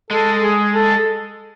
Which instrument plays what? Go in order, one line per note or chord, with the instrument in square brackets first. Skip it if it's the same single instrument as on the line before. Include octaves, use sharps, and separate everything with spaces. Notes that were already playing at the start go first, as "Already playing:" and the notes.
[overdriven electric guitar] G#3 [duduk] A4
[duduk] G#4
A4